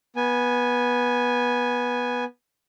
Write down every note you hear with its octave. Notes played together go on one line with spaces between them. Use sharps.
B3 G#5